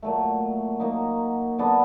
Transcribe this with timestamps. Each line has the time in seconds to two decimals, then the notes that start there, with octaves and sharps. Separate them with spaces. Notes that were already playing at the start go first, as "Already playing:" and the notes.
0.03 A#2 F#3 A3
0.80 F#3 A#3 D#4
1.58 D3 F#3 B3 D4